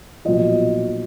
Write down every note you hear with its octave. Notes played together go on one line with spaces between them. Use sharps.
B1 A#2 F3 D#5